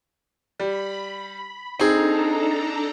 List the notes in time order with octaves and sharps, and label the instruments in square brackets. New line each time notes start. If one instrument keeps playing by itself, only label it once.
[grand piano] G3 [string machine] B5
[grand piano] C4 G#4 [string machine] D4 A4 A#5 [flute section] D#4